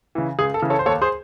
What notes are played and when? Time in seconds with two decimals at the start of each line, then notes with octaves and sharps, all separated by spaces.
0.15 C#3 E3
0.39 C#2 G#4
0.54 A4
0.62 C#3 E3
0.70 A4 C#5
0.79 C5
0.86 D#2 A4 C#5
1.02 G#4 C5